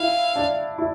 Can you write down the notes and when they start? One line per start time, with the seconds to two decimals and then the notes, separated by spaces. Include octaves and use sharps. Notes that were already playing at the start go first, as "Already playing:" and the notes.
Already playing: E4 F5
0.36 D4
0.78 E4